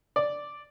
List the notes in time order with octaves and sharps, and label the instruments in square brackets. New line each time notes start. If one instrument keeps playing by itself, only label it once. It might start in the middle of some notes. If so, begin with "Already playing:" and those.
[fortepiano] D5